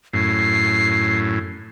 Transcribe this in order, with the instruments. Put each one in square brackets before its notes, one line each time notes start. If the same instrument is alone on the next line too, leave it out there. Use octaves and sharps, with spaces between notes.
[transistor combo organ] F#2 A2 [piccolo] C7